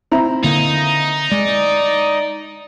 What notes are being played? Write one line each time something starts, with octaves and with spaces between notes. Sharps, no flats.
C4 E4 A#5
D3 A#3 D#4
G#3 D5